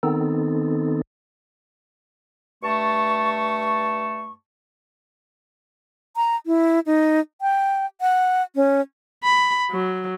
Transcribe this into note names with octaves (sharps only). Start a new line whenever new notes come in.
D#3 B3 C4 D#4 A4
G2 A3 A5 C#6
A#5
E4
D#4
G5
F#5
C#4
B5
F#3